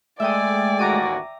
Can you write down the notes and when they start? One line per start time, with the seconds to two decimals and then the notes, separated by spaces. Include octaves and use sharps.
0.20 G#3 A3 D5 E5 G5 G#5 D#6
0.79 A1 D#2 F#4 A#5 D6 D#7